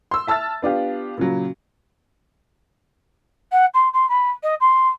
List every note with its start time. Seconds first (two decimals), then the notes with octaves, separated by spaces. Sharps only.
0.11 C6 E6
0.27 E5 A5 E6 F6 A6
0.62 B3 D4 F4 G4
1.18 A#2 C#3 F#3
3.52 F#5
3.74 C6
3.93 C6
4.09 B5
4.43 D#5
4.60 C6